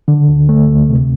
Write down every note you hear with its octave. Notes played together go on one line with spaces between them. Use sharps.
D3
D2
A3
D2
C3